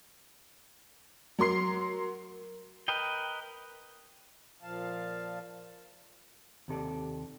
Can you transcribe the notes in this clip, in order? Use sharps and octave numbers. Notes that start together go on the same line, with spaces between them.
F#3 A#4 C6 C7
A#4 B4 D#5 G5
A#2 F3 F5 A5
D#2 C3 A4 D5